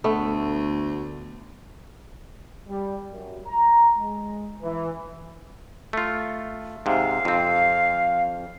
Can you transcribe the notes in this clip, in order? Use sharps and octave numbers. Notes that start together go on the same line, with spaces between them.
D2 A3 B3
G3
F#2
A#5
G#3
E3
A3 F4
G#2 C3 F5
F2 C4